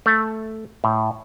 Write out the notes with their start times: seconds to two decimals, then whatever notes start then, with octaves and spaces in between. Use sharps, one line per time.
0.06 A3
0.84 A2